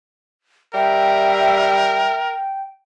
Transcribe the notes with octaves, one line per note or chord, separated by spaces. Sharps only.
G3 A#4 E5 G5